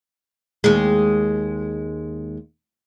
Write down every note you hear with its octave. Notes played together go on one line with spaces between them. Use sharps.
D#2 G#3